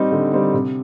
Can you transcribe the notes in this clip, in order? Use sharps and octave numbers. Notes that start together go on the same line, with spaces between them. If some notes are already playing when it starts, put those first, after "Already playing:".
Already playing: G3 C4 D#4
D3
G3 C4 D#4
C3